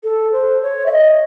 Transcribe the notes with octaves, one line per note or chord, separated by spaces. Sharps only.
A4
C5
C#5
E5
D#5